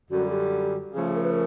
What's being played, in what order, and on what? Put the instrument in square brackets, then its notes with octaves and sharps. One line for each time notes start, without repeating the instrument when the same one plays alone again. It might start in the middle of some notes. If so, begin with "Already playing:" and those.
[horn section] F#2 D3 G3 [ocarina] F#4
[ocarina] G4
[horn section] C#3 F3 A3 [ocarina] G#4
[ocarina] A#4
B4
A#4